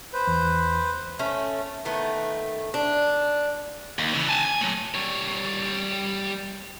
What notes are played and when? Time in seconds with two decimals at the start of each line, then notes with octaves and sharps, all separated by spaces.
0.13 B4 C5
0.27 E2
1.19 A3 C#4
1.85 D#3 A3 B3
2.74 D4
3.99 D#2
4.14 C#3 E3
4.29 G#5 A5
4.45 G#5
4.61 F#3 A3
4.94 G3 C#5